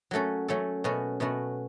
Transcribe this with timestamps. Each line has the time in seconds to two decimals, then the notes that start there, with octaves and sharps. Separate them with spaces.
0.11 F#3 A3 C#4 F#4 A4
0.48 F#3 A3 C#4 F#4 A4
0.84 B2 A3 C#4 F#4
1.20 B2 A3 C#4 F#4